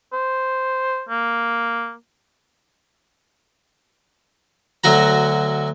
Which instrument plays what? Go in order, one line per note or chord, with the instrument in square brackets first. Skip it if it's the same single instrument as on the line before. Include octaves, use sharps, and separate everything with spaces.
[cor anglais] C5
A#3
[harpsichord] D2 F#3 F#4 A#5